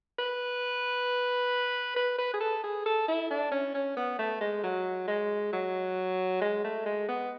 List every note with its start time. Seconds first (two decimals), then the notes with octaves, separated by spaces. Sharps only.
0.19 B4
1.96 B4
2.19 B4
2.34 G#4
2.40 A4
2.64 G#4
2.86 A4
3.08 E4
3.31 D4
3.52 C#4
3.74 C#4
3.97 B3
4.19 A3
4.41 G#3
4.63 F#3
5.08 G#3
5.53 F#3
6.41 G#3
6.64 A3
6.86 G#3
7.08 B3